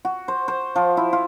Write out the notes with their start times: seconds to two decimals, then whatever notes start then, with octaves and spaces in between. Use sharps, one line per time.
0.05 F#4
0.28 C5
0.48 C5
0.76 F3
0.97 E4
1.13 F4